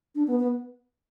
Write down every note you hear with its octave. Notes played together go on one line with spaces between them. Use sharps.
D4
B3
B3